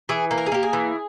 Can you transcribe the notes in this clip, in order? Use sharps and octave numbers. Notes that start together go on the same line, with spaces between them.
E3 G#4
A#3
A#4
G#4
A#3 G4
G#4
E3